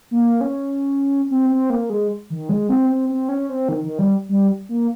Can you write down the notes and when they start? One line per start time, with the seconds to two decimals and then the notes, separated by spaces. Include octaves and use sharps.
0.11 A#3
0.41 C#4
1.31 C4
1.50 C4
1.70 A#3
1.90 G#3
2.30 D#3
2.49 G#3
2.69 C4
2.89 C4
3.09 C4
3.29 C#4
3.49 C4
3.69 D#3
3.84 D#3
3.99 G3
4.29 G3
4.69 A#3